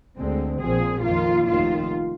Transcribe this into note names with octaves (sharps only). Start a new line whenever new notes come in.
D2 D3 G#3 C4
A#1 A#2 F3 C4 G#4
F2 D#3 A#3 F4
F1 D#2 D#3 F4